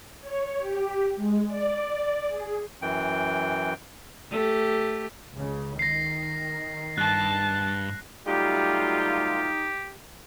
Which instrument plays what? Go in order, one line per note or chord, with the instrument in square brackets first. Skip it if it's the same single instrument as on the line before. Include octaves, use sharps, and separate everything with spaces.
[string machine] C#5
G4
G#3
D5
G#4
[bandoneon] F#2 E3 G5
[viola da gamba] A3 G4
[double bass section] C#2 C#3
[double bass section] D#3 [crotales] A#6 C7
[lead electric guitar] G2 [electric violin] A5 A6 [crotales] F#6
[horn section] F#3 A3 F4 [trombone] G3 [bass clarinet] D#4 [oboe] G4